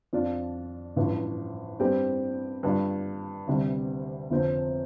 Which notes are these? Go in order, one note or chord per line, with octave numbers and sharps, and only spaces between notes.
F2 F3 D4 F4
A1 G2 F3
G2 G3 C4 G4
G2 G3 D4 F4
D2 C3 G3 D4
G1 F2 F3 C4